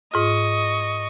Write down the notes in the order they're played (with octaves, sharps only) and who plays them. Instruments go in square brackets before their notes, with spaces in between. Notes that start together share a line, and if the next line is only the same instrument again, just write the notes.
[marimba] G#2 F4 [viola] D#5 C#6